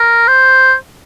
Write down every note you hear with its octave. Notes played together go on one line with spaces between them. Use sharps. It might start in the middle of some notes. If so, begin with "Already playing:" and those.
Already playing: A#4
C5